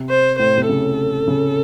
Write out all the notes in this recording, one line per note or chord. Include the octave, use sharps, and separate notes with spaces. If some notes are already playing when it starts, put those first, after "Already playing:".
Already playing: C3
C5
A2 C5
C3
C#3 A4
C#3